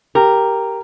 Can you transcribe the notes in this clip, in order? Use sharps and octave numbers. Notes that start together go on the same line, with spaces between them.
G4 A#4